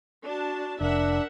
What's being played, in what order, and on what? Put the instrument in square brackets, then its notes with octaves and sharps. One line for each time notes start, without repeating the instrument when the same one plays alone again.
[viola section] D4 F#4 A5
[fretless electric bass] F1 [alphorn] D4 [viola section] A#4 E5 F#5